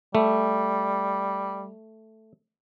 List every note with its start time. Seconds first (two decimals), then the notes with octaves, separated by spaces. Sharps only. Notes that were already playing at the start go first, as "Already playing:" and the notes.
0.15 G3 A3